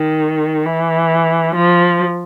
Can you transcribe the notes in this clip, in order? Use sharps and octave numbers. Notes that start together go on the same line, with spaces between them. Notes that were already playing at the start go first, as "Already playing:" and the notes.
Already playing: D#3
E3
F3